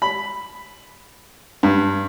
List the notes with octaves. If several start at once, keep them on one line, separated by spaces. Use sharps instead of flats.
B5
G2